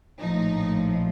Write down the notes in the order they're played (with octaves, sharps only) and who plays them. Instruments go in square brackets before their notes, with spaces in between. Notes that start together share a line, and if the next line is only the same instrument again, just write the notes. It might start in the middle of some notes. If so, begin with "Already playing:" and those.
[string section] A#1 A2 F3 D#4